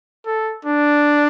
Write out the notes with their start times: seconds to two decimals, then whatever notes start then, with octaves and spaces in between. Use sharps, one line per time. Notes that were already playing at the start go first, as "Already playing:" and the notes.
0.26 A4
0.65 D4